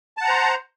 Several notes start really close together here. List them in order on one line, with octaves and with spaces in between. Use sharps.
A5 F#5 A#5 C5